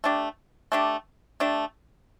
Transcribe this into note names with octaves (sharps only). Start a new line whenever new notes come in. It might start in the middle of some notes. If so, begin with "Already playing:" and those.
A3 D4 G4
A3 D4 G4
A3 D4 G4